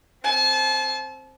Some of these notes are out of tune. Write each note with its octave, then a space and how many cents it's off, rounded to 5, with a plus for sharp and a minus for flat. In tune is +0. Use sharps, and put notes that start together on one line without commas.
C4 +10 A5 -35